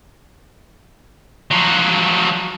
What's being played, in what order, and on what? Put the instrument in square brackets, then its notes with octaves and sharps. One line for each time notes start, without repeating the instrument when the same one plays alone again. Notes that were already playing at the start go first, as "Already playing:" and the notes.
[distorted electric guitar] F3 F#3